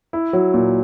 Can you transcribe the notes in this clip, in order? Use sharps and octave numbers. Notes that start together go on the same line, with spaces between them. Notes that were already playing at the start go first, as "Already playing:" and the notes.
E4
F#3
A#2